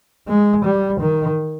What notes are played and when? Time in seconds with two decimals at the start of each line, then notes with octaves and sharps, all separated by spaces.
0.28 G#3
0.65 G3
1.01 D#3